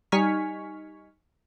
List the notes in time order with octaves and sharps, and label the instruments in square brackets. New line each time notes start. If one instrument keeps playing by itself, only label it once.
[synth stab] G3 D#4 G#5 C#6 F6 B6